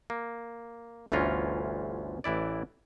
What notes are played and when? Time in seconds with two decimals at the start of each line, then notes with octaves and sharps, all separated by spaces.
0.10 A#3
1.12 G1 D2 E3 C#4 F4 A#5
2.24 A1 E3 E4 D5